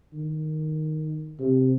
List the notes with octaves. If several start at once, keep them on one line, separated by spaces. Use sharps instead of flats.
D#3
C3